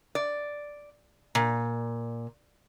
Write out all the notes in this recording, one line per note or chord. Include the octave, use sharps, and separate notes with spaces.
D5
A#2